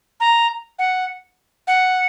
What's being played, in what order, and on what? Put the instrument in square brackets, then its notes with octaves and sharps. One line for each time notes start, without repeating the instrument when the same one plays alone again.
[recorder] A#5
F#5
F#5